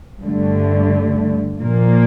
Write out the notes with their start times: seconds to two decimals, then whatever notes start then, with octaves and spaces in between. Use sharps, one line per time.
0.22 G2 D3 A3
1.61 A#2 F3 A#3